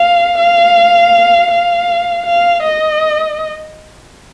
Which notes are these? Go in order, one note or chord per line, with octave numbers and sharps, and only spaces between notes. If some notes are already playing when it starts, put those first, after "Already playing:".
Already playing: F5
F5
F5
F5
D#5